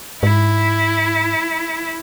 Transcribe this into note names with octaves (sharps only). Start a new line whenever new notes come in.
G#2 E4